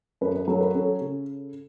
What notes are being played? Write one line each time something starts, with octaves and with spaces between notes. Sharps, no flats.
F#2 B4
B4
F#3 A4
B4
C#4 A4
C#3